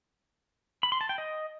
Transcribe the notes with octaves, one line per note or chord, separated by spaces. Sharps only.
B5
C6
A5
G5
D#5